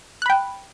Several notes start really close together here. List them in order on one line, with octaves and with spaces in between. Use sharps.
F#6 B5 G5